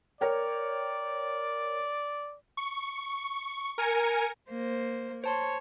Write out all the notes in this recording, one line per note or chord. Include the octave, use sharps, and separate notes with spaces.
A#4 C#5 D5 G5
C#6
A#4 G#5 C#7
A#3 C5
C5 C#5 A5 C6